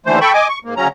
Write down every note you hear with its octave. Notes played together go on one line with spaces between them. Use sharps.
D#2 D3 E3 A3 C5
A4 G5 B5 C#6
D#5 G#5 D6
C#6
G#2 A#3
D2 C#3 F#3 C#4 A#5